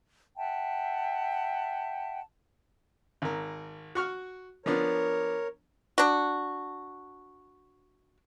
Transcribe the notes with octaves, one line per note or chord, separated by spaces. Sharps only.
E5 F#5 G5 A5
G#1 A#4
F#4 C#6 F6
F3 B3 D4 A#4 C#5
D4 F#4